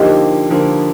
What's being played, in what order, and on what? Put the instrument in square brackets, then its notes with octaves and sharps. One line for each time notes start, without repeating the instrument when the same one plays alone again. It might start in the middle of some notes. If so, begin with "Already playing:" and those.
Already playing: [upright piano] D3 F3 A#3 [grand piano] D#4 G4
[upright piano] D3 F3 A#3